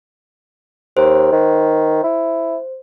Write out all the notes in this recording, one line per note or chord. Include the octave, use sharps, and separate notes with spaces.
D#2 C5
D#3
E4